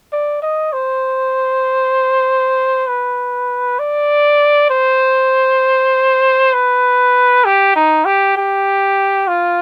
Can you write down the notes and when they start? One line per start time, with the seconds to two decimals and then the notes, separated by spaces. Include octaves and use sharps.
0.13 D5
0.42 D#5
0.73 C5
2.88 B4
3.79 D5
4.70 C5
6.54 B4
7.45 G4
7.76 D#4
8.05 G4
8.37 G4
9.28 F4